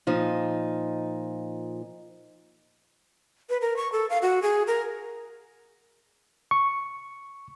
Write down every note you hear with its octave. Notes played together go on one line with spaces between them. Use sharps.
A#2 F3 D#4
B4
A#4
C#6
A4
F5
F#4
G#4
A#4
C#6